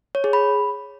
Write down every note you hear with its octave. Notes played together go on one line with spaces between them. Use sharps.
C#5
G#4
B5